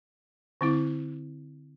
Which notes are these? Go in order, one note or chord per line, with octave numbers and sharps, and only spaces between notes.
D3 C4 E4